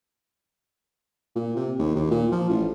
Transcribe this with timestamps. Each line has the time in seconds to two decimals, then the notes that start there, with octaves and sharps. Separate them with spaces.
1.36 A#2
1.56 C3
1.78 D#2
1.95 D#2
2.11 A#2
2.32 F3
2.49 A1